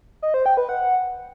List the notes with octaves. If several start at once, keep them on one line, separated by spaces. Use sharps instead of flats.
D#5
C5
G5
B4
F#5